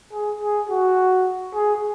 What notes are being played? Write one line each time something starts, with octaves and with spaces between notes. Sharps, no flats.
G#4
G#4
F#4
G#4